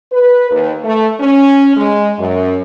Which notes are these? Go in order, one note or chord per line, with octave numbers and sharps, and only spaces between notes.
B4
D#2
A3
C#4
G#3
F#2